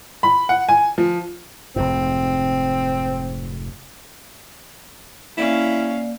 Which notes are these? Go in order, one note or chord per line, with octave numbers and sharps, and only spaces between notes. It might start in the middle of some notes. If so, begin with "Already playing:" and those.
B5
F#5
G#5
F3
F1 F2 G#2 C4
A#3 C#4 E4 D5 F5